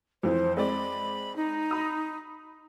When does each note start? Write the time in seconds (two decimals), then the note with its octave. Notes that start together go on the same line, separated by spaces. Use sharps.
0.23 F2 E3 C5
0.57 G#3 C4 D5 B5
1.36 D#4
1.71 B5 D#6